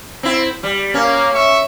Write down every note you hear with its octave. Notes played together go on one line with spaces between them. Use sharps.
C4 E4
G3
A#3 C#4
E5 C#6